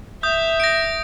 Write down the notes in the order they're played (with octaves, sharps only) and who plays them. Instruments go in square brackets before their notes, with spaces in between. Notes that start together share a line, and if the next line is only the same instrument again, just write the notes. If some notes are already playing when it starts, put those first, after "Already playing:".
[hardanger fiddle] E5 [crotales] D#6 G6
[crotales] A#6 D7